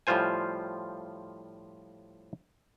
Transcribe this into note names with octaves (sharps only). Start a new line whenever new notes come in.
A2 F3 G3 F4 C5 G#5